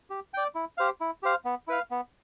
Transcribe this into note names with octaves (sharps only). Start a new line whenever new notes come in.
G4
D5 G5
E4
G4 C5 F5
E4
G4 C5 F5
B3
E4 B4 F5
B3